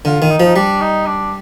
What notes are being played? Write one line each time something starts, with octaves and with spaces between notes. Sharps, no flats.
D3 F4
D#3
D#4
F3
D#4
G3 D4
D#4
D4